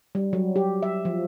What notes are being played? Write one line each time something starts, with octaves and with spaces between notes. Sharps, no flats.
G3
F#3
G4
E5
F3